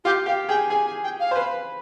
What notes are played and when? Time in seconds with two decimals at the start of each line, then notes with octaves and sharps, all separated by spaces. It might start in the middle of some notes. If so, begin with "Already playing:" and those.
0.04 F4 G4
0.26 G4 F5
0.48 G#4 G5
0.69 G#4 G#5
0.86 G#5
1.03 G5
1.19 F5
1.31 C5
1.36 B4